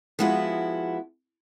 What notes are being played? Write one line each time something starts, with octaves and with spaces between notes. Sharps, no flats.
F3 G#3 B3 E4 F#4